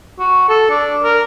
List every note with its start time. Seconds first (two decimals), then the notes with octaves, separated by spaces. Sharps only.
0.19 F#4
0.49 A4
0.70 D4
1.04 A#4